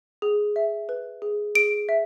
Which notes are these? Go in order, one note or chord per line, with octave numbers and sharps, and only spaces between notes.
G#4
E5
B4
G#4
G#4 D7
E5